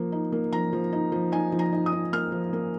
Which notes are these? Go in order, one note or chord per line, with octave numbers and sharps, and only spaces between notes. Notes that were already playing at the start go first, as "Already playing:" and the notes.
Already playing: F3 A#3
D#4
A#3
F3 A#5
F3
D#4
F3
D#4 G#5
F3
A#5
D#4
D#6
D#4
A#3 F6
F3
A#3